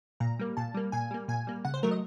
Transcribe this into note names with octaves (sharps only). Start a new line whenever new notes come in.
A#2 A#5
G3 A#3
A#2 A5
G3 A#3
A#2 G#5
G3 A#3
A#2 G#5
G3 A#3
C#3 F#5
C5
F#3 A3 A#4
D#5